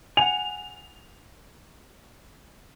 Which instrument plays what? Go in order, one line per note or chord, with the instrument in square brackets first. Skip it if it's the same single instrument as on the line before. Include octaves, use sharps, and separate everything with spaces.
[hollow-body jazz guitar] F#5 G#5 [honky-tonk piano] F7